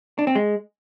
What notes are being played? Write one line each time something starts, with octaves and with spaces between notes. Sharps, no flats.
D4
C4
G#3